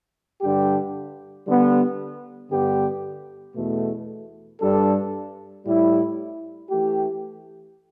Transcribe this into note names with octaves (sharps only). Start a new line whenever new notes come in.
G2 D3 G3 D4 G4
D3 G3 B3
G2 D3 B3 G4
E2 B2 A3
G2 G3 D4 A4
A2 G3 E4
E3 A3 G4